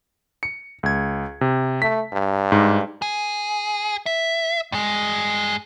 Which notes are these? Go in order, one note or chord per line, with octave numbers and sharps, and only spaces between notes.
C#7
C#2 G#6
C3
A3 B6
G2
G#2
G#4
E5
G2 G#3